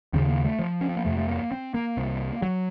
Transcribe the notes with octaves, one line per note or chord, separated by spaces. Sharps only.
D#2 C#3 C4
A#3
A3
F3
C#4
C4
A#3
F2 C3 A3
A3
A#3
C4
A#3
C2 C3
F#3